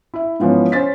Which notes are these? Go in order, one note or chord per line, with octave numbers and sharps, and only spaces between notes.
E4 E5
G#2 E3 F3 B3 C#4
C#4 C5 A6 B6